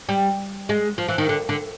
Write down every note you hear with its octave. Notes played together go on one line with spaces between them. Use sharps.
G3
G#3
F3
E3
D#3
D3
D3